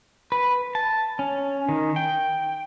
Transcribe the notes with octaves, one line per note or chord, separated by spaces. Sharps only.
B4
A5
C#4
D#3
G5